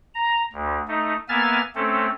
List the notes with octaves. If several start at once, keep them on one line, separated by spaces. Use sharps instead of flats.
A#5
D2
A3 D#4
A#3 B3 E5 G#5 F6 A6
A3 C4 C#4 A4